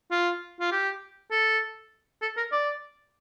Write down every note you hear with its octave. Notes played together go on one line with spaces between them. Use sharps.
F4
F4
G4
A4
A4
A#4
D5